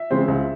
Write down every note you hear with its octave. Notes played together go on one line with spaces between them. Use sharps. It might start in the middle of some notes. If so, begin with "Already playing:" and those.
Already playing: E5
C#3 E3 G#3 C4
C#2